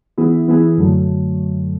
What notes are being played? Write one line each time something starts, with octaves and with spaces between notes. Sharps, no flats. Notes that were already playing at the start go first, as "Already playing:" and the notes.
E3 B3 E4 G#4
E3 B3 E4 G#4
F#2 D3 F#3 A3